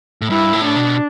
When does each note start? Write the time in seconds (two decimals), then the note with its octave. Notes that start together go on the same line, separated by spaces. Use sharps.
0.21 A2
0.30 G2 E4
0.53 A2
0.64 D4
0.76 B2